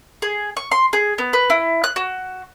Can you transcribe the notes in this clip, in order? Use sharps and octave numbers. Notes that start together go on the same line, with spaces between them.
G#4
C#6
C6
G#4
B3
B4
E4
F#6
F#4